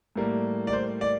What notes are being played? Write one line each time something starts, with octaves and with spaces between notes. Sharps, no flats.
A2 G3 A#3
D5
C5
D5